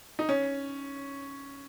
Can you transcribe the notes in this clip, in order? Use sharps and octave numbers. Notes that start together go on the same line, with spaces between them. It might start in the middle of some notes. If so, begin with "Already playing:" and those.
D#4
C#4